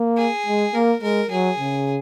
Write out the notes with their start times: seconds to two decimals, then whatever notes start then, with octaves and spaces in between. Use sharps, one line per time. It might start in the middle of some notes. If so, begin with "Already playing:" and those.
Already playing: A#3
0.17 G#4
0.46 G#3
0.74 A#3 A#4
1.02 G#3 A#4
1.31 F#3 G#4
1.59 C#3